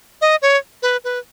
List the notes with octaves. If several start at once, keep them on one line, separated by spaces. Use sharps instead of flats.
D#5
C#5
B4
B4